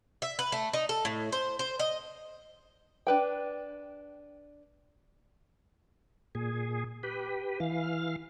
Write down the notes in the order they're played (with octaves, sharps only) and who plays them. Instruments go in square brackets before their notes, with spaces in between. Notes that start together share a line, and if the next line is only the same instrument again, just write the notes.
[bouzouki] E5
B4
A3
D#4
A4
A2
C5
C5
D#5
[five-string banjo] D4 B4 G5
[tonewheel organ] A#2 G#4
G4 B4
E3 F5